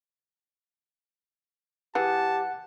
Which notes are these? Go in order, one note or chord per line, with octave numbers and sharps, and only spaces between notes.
E3 G4 G#4 F#5 A5